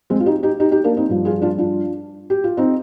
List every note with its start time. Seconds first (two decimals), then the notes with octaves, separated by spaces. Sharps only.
0.10 G#3 C4
0.20 F4
0.26 D#4 G4
0.43 D#4 G4
0.60 D#4 G4
0.71 D#4 G4
0.84 A#3 D4
0.97 C4 D#4
1.10 G2 F3
1.25 F4 G#4
1.42 D4 F4
1.58 D4 F4
2.30 G4
2.44 F4
2.57 C4 D#4